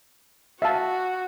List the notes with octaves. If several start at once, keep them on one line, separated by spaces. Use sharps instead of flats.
F#4 E5 F5 A5